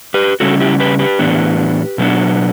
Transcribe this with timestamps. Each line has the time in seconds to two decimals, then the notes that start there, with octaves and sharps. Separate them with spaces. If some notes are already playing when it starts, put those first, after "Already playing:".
0.14 G4 B4
0.40 C#3 G3 C#4 F#4 A4
0.60 E4 G4
0.80 G4 B4
0.99 G4 B4
1.19 A2 E3 B3 D4
1.98 B2 F#3 B3 D4